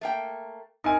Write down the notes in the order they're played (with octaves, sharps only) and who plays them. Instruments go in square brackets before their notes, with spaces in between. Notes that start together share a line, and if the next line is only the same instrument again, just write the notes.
[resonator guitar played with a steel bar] A3 A#3 G5
[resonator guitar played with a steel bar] C3 [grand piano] D#4 A#4 G#5